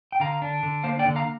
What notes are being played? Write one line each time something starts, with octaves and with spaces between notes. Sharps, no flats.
G5
D3 F5 A#5
D4
D3
A#3 C5 F5
D5 G5
D3
F5 A#5